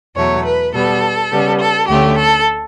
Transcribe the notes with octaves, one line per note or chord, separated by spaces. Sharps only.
E2 B2 F#3 A3 C#5
B4
B2 G3 B3 A4
C#3 G3 B3
A4
D2 D3 A3 C#4 G4
A4